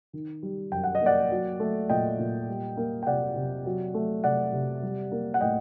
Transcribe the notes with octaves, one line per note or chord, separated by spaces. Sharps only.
D#3
G3
F#2 G5
F#5
D#5
A#3
D5 F#5
F#3
A3
A#2 D#5 G5
A#2
G3
A#3
G5
C3 D5 F#5
C3
F#3
A3
C3 D5 F#5
C3
G3
A#3
F#5
A2 D#5 G5